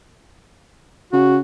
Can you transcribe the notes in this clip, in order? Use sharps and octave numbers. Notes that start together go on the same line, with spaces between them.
C#3 F#4